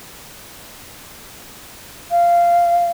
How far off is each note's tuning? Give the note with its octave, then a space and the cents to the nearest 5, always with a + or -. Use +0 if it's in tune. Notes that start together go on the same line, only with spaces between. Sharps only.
F5 -15